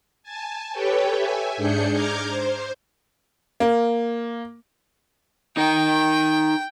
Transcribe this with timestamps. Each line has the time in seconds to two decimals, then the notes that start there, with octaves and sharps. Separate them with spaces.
0.23 G#5 A5
0.72 G4 A4 B4 C#5 G5
1.14 E5 G#5
1.57 G#2 D4 G#4 G6 C#7
1.91 A#5 D6 F6 G6 G#6
2.29 C5
3.60 A#3
5.57 D#4 A#4 G5